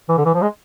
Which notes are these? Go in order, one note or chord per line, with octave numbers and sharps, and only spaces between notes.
E3
D3
E3
F3
G#3